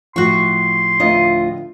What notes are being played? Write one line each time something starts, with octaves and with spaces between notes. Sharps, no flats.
A2 F3 F#4 C6 C#6
D2 F4 D#5